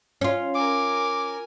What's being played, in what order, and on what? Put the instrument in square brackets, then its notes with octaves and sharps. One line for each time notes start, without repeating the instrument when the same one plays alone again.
[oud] C#4 F4
[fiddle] A#4 G#5 [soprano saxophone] D6